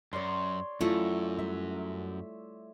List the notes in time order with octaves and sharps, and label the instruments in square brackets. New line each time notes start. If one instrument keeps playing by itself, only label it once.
[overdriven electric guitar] F#2 [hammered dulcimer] C#5 D5 C6
[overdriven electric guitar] F#2 [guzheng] A3 [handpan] E4 F4
[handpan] G3 [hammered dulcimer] E5